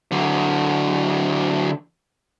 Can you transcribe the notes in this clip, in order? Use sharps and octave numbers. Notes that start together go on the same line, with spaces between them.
D3 F#3